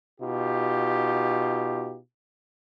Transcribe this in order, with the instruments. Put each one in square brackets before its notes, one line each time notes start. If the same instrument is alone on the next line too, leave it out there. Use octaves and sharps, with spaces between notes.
[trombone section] B2 D#4 F4 G4